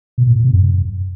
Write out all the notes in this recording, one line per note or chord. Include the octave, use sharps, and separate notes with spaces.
B2
A#2
A2
C3
F#2